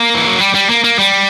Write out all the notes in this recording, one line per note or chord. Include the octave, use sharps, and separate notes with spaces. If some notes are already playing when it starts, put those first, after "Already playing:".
Already playing: A#3
E3
F#3
G3
G3
A#3
A#3
G3